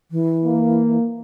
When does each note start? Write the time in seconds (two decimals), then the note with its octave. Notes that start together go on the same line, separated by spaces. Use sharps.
0.11 E3
0.44 A#3